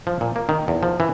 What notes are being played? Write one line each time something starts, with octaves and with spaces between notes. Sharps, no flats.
F3
A#2
A#3
D#3
E2
F3
E3